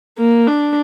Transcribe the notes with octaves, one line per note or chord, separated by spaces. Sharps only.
A#3
D4